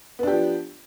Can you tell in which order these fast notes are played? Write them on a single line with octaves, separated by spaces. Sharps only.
B3 D4 G4 F3